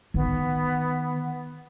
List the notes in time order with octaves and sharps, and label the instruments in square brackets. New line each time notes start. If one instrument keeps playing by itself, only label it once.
[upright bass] D#3 [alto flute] B3